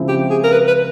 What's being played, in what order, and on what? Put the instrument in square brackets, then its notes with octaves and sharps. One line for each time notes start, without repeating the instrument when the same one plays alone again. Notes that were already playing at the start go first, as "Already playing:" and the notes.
Already playing: [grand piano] C#3 F3 G#3 C4 E4
[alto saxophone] G4
G#4
A#4
B4
B4